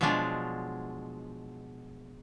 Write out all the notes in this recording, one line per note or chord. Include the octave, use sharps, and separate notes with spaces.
B2 F3 F#3 G#3 D4 F4